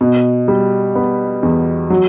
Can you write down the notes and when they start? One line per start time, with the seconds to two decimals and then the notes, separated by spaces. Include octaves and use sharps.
0.01 B2
0.48 G3
0.95 B3
1.43 E2
1.90 F#3